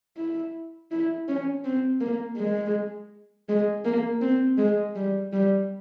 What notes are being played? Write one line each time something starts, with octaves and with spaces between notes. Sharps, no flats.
E4
E4
C#4
C4
A#3
G#3
G#3
A#3
C4
G#3
G3
G3